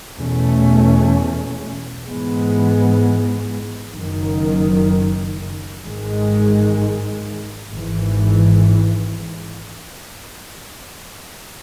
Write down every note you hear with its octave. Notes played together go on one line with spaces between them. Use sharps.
E2 B2 A3 C#4
G#2 E3 G#3 B3
F#1 F#2 D#3
G#1 G#2 D#3 G#3
G#1 G#2 E3